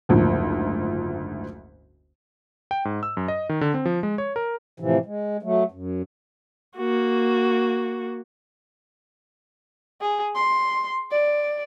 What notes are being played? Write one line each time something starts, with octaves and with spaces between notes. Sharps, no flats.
F#1 D2 G#2 F3
G5
G#2
E6
F#2
D#5
D#3
D3
C4
F3
G#3
C#5
A#4
A2 C3 E3 F3
G#3
F#3 A3
F#2
A#3 F#4
G#4
C6
D5